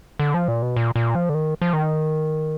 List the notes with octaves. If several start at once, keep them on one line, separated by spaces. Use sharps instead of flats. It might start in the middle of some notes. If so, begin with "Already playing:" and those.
D3
F3
A#2
B2
A#2
A#2
F3
D3
D#3
F3
D#3